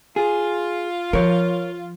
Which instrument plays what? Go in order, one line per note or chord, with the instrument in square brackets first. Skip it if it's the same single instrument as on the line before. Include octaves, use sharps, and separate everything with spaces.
[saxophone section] F4 [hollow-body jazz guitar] G#4
[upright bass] F3 [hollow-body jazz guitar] A#4 C#5